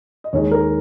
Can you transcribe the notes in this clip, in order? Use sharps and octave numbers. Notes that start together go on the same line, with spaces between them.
D#5
D#2 D#3 G#3 C#5
A#4